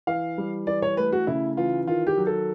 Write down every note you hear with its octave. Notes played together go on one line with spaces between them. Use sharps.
E3 F5
G3
E3 D5
C#5
A3 B4
F#4
C#3 E4
E3 F4
D#3 F4
G4
F#3
A4